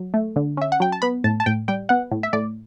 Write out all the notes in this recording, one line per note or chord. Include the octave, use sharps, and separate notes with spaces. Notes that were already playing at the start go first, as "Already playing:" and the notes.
Already playing: F#3
A3
D3
C#4 E5
F#5
F#3 G5
A5
B3 B5
A2 A5
A5
A2 G5
G3 G5
B3 F#5
A2
E5
A2 D5